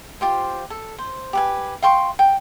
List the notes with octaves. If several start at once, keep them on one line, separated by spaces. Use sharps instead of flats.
F4 G4 C5
A4
C5
G4 B4 G#5
F5 G5 C6 C#6
G5